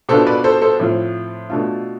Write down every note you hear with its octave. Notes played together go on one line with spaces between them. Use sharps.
B2 B3 D4 F4 A4 C5
B4 D5
A4 C5
A4 C5
A2 F3 C4 F4
B2 A3 D4 F4